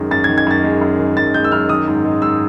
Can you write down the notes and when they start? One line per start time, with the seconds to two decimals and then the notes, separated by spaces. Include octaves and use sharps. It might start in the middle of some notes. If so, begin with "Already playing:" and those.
Already playing: F#2 D#3 G#3
0.11 F#2 A6
0.24 G#6
0.29 D#3
0.38 G#6
0.46 F#2 A6
0.64 G#3
0.81 F#2
0.99 D#3
1.17 F#2 A6
1.34 G#3 G6
1.44 E6
1.52 F#2 F6
1.69 D#3 D#6
1.87 G#2
2.05 G#3
2.22 G#2 E6